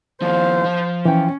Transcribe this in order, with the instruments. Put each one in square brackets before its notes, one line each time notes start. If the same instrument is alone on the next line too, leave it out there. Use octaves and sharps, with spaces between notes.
[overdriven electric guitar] D#2 F3 [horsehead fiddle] C5 F5
[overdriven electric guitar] F3
[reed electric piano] E3 G5 [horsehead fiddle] C#4